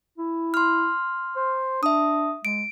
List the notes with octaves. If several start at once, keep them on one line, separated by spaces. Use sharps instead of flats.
E4
C6 F6
C5
D4 E5 D#6
G#3 D7